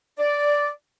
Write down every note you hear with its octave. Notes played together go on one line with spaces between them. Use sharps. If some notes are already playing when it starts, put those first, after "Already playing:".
D5